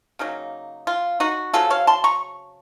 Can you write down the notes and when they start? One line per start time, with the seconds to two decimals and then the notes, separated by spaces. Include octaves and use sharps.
0.19 C#3 F#3 A#3 D#4
0.87 F4
1.20 D#4 F#4
1.54 C#3 F#3 C4 F4 A4
1.70 C#5 F5
1.87 A5 C6
2.04 A#5 C#6